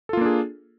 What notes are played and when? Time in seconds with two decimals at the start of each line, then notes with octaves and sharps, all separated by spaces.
0.09 A4
0.13 F4
0.17 A#3
0.21 D4
0.25 G#4